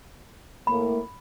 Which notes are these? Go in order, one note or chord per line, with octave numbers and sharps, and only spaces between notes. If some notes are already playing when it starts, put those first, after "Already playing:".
A2 A#3 B5